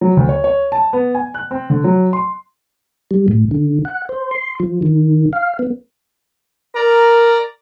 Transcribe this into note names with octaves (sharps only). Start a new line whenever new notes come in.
F#3
D2
C#5
C#5
A5
B3
G#5
F#6
C4
D3
F#3
C6
G3
A2
D3
F#5
C5
C6
F3
D#3
F5
B3
A#4 D5 A#5